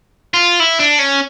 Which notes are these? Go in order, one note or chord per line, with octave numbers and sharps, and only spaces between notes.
F4
E4
D4
C#4